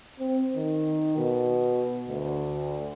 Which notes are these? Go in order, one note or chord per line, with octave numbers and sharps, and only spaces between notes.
C4
D#3
B2
D2